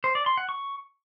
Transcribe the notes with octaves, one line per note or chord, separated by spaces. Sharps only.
C5
D5
C6
F#5
C#6